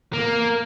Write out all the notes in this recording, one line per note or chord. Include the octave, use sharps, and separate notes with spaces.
A#3